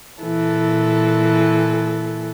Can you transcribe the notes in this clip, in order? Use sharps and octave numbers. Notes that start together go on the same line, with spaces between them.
A#2 E3 A4